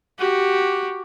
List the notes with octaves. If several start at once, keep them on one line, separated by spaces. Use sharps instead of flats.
F#4 G4